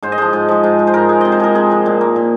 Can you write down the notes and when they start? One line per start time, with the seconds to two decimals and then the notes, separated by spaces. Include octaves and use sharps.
0.03 G#2 C5
0.12 D#5
0.18 F3 G#3 C5
0.33 G#2
0.48 F3 G#3
0.63 G#2
0.79 G#3
0.87 C5
0.94 G#2 A#4
1.09 G#3
1.21 C3 D#5
1.32 C5
1.40 F3 G#3 A#4
1.55 C3 G#4
1.70 F3 G#3
1.86 A#2
2.01 A#3
2.16 A#2